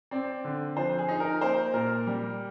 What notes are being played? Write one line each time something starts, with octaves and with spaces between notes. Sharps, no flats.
C4 D5
D3
F3 C5
G#4
D#4
A#4
A#3 C5
A#2 A#4
G3